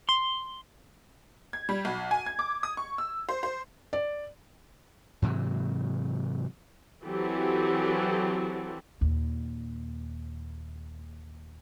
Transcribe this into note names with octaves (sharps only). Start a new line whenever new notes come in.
C6
G#6
G3
B1
G#5
G#6
D6
D#6
C#6
E6
C5
C5
D5
G#2 C3 E3 F#3
E3 F#3 C4 F#4 G4 A4
D#2 A#2